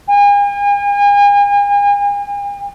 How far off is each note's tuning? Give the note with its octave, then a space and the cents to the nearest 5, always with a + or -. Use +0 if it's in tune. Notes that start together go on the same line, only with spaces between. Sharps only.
G#5 -40